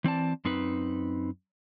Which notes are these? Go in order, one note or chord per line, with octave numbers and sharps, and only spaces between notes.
E3 C4 D5 A5
F#2 C4 D#4 B4